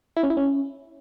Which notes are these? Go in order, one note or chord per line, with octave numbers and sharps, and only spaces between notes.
E4
C#4
E4
C#4